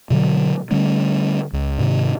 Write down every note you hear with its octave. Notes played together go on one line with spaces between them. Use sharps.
B2 D3 D#3 F#3
D3 G3 A3 C#4
C#2
G#2 C3 D#3